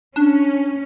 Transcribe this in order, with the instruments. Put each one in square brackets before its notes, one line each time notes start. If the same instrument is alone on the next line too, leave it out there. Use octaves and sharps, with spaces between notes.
[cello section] C#4 [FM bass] D4